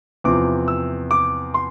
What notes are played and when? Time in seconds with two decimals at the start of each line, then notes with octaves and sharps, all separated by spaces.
0.24 E2 C3 F3 C4 D6
0.68 E6
1.11 D6
1.54 C6